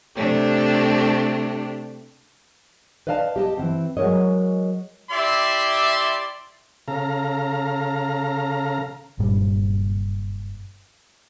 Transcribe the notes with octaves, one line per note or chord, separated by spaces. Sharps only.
C3 A3 D4 G4
B4 D5 D#5 F5 G5 A5
G4 D#5 A5
E3 F3 C4
F#3 G#3 A#4 C#5 D#5
E4 G4 D5 E5 C6
C#3 A4 F5 A#5
F#1 G2 A#2 G3